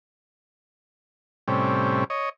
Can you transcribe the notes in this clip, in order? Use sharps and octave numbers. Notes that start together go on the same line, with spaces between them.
A2 C3 G3 C#4
C#5 D#5